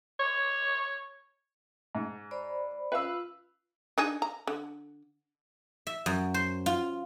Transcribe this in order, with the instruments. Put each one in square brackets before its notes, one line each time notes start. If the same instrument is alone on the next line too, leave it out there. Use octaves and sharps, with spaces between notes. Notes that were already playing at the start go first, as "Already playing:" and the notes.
[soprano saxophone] C#5
[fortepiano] G#2
[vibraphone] C5 D5 B5
[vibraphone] F4 [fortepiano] B4 F5 E6
[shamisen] D4 D#4 G#4
A#5
D3
[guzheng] E5
F#2
C5
F4